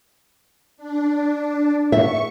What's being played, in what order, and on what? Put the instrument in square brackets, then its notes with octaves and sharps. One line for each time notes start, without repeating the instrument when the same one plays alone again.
[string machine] D4
[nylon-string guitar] E5 [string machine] C#6